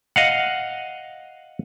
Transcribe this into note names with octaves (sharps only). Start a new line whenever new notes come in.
D#5 F5 F#5